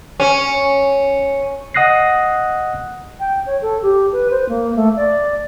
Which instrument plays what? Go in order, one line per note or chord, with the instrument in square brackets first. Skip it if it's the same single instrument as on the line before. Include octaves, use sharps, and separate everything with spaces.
[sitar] C#4
[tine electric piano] D#5 F#5 D#6 F#6 A#6 C7
[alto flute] G5
C#5
A4
G4
B4
C5
A#3
A3
D5